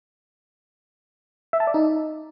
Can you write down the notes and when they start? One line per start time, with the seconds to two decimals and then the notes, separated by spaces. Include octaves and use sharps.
1.53 E5
1.60 A5
1.67 D5
1.74 D#4